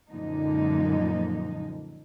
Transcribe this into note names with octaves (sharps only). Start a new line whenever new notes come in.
F#2 A#2 D3 F3 G#3 D#4